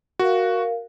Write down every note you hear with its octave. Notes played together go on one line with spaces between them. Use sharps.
F#4 A#4 F5